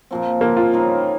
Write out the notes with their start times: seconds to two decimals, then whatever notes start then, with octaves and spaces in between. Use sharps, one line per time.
0.11 A#2 F3 C4
0.41 A#2 F3 A#3 C4
0.57 F4
0.73 C#3 G3 C4 D#4